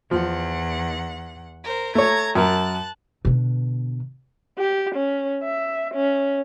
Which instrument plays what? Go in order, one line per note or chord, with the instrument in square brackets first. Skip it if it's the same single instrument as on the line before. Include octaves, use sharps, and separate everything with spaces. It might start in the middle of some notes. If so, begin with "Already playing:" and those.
[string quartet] E2 F#5 [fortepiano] F3
[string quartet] A#4 C5
[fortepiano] A3 C#5 [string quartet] A#5 G#6
[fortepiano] F#2 A#4 [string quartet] A5 F#6
[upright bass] B2 D3
[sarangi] G4
C#4
E5
C#4